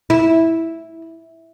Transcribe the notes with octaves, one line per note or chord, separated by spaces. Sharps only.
E4